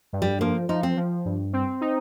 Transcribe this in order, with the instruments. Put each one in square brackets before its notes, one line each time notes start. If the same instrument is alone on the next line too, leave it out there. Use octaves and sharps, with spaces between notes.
[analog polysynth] G2
[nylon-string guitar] G3
[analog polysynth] F3 [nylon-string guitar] A#3
[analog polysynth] F3 [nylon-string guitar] D#4
[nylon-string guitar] C4
[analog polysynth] F3
G2
C4
D#4